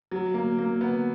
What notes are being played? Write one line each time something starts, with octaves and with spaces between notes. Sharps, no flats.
F#3
A#3
A#3
B3